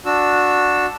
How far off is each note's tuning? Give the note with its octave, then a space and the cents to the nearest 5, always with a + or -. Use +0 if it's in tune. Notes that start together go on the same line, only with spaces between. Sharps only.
D4 +0 F#4 -15 E6 +0